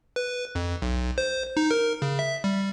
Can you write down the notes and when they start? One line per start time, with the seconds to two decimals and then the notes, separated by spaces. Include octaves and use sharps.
0.16 B4
0.55 F2
0.82 B1
1.18 C5
1.57 D#4
1.71 A#4
2.02 C#3
2.19 E5
2.44 G3